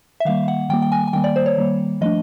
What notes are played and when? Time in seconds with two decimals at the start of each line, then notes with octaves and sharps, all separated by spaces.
0.20 E5
0.25 D#3 G3 A#3 F5
0.48 F#5
0.69 D#3 G3 A#3 G5
0.82 G5
0.92 G#5
1.08 G#5
1.13 D#3 G3 A#3 G5
1.24 D5
1.36 C5
1.46 C#5
1.57 D#3 G3 A#3
2.01 F3 A3 D4 D#5